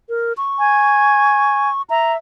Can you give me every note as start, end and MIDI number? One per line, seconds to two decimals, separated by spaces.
0.09 0.33 70
0.37 1.82 85
0.59 1.69 80
1.90 2.17 76
1.90 2.13 82